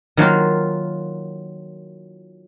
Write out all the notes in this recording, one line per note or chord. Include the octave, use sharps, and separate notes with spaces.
D#3 F#3 A#3 F4